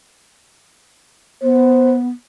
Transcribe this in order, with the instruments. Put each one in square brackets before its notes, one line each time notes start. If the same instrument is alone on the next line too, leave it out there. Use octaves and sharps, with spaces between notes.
[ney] B3 [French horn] C5